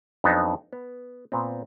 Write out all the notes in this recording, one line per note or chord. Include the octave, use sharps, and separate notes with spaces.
F2 F#3 B3 D4 D#4 F#4
B3
A#2 B3 C4